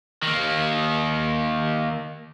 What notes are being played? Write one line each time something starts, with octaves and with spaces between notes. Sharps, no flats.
D#3 A#3